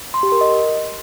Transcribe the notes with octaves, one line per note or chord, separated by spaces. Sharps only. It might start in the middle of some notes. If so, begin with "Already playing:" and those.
C6
G4
A#4
D#5